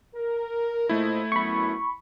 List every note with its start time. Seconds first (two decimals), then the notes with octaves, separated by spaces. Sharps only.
0.15 A#4
0.89 A#2 A3 E4 C5 D#5
1.32 F#2 B3 B5 C#6